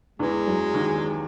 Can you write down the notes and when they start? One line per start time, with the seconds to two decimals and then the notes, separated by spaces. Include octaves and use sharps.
0.19 E2 E3 G#3
0.47 F#2 F#3
0.74 D#2 D#3